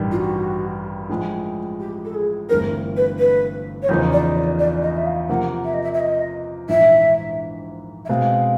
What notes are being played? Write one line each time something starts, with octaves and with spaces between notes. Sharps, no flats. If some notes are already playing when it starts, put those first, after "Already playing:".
Already playing: A1 G2 D#3 G3
F4
F#4
A2 F3 G#3
G4
A4
G#4
G1 G2 E3 A3 C4 A#4
B4
B4
C#5
E2 C#3 F3 A#3 D#4 C5
D5
D5
D5
D#5
E5
F5
C3 F3 A#3 F#5
E5
D#5
E5
E5
D#5
A#1 G#2 E3 E5
E5
B2 G#3 C4 F5